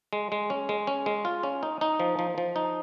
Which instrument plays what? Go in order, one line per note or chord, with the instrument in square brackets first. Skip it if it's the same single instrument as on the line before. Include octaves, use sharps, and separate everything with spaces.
[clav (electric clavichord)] G#3
G#3
C#4
G#3
C#4
G#3
F4
C#4
D#4
D#4
F3
F3
F3
D#4